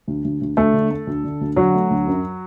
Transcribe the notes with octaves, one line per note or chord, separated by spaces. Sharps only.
D2
D2
D2
D2 A3 A4
D3
A3
D2
D3
D2
D3 F#3 F#4
A3
D2
F#2